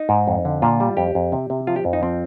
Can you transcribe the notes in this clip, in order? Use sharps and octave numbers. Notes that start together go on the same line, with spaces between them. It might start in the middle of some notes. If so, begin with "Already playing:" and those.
Already playing: D#4
G#2
F2
D3
A#2 F4
G3
F2 G4
F2
C3
C3
F3 F4
G4
F2
D#4
F3 C4